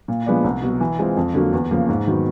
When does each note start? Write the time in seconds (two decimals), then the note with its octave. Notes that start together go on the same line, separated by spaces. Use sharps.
0.08 A#2
0.26 F3 G#3 B3 D4
0.44 C2
0.62 B2 F#3
0.81 E3
0.99 G#3 C4 F4
1.17 F2
1.34 D3 F#3 A#3
1.53 E2
1.71 C#3 F3 A#3
1.89 G#2
2.07 D#3 F#3 B3